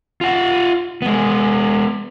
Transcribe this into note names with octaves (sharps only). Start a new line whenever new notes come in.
F4 F#5
G#3 B3